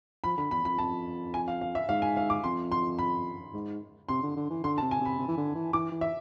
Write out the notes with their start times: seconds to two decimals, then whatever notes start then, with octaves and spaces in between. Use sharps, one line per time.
0.24 F3 B5
0.37 D3 B5
0.51 E2 B5
0.65 F2 B5
0.78 F2 A5
1.34 G#5
1.48 F5
1.61 F5
1.75 E5
1.89 G#2 F5
2.02 G#5
2.17 F5
2.30 D6
2.44 F2 C6
2.72 C6
2.99 B5
3.54 G#2
4.09 C3 C6
4.23 D3
4.36 D3
4.50 E3
4.64 D3 C6
4.78 A5
4.82 C3
4.91 G#5
5.00 C3 B5
5.19 C3
5.28 E3
5.37 D3
5.55 E3
5.73 E3 D6
5.92 E3
6.01 E5